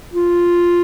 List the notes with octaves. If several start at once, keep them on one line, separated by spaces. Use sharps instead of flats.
F4